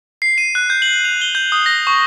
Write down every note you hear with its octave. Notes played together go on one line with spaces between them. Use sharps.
C7
D#7
F#6
G6
F#7
F7
G7
G6
D#6
A#6
C#6